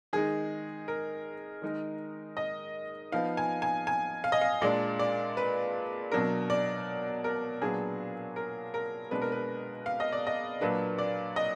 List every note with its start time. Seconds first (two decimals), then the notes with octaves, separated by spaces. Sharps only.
0.13 D#3 G#3 D#4 G#4
0.88 A#4
1.62 D#3 G#3 D#4
2.37 D#5
3.12 F3 B3 D#4 F5
3.37 G#5
3.62 G#5
3.87 G#5
4.24 F5
4.32 D#5
4.41 F5
4.62 A#2 G#3 D4 D5
4.99 D5
5.37 B4
6.12 B2 F#3 D4 A#4
6.50 D5
7.24 A#4
7.62 A#2 F#3 B3 D4 G#4
8.36 A#4
8.74 A#4
9.11 B2 G#3 D4 B4
9.22 A#4
9.32 B4
9.86 F5
10.00 D#5
10.12 D5
10.27 D#5
10.61 A#2 F#3 A#3 D4 B4
10.98 D5
11.36 D#5